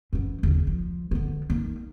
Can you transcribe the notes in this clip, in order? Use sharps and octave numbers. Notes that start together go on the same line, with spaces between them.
F#2 E3
D#2 C#3
F3
D3 B3
A#3 D#4